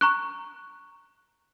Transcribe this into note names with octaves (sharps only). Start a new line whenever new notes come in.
A#5 C#6 F#6